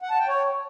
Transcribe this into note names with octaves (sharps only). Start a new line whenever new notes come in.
F#5
A5
G5
C#5